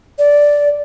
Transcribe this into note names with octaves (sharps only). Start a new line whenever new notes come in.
D5